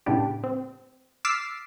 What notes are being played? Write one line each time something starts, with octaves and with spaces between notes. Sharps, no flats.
A2 C#3 B3 D4 G4
C4
D6 E6 F6 A6 B6 C7